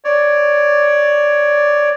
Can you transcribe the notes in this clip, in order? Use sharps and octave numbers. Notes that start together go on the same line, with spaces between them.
C#5 D5